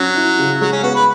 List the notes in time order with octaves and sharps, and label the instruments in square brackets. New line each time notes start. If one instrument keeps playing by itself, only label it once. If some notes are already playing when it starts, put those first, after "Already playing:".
Already playing: [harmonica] F#3 [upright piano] C#4
[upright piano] E4
C#3
[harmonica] F#3 [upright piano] G#3
[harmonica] C#4
[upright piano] B3 [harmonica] F#4
[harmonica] B4